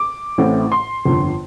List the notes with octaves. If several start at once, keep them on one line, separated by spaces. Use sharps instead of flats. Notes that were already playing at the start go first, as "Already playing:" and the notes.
Already playing: D6
A1 A2 A3 C4
C6
G1 F2 D3